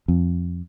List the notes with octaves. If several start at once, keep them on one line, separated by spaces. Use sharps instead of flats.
F2